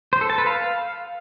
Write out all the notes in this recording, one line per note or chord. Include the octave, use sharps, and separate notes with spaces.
C5
A4
A5
B4
F5